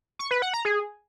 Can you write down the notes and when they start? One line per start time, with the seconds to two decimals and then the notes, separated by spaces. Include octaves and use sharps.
0.19 C#6
0.31 B4
0.42 F#5
0.54 A#5
0.65 G#4